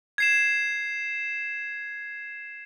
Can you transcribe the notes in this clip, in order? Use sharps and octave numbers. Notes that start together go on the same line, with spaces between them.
G#6 C7 E7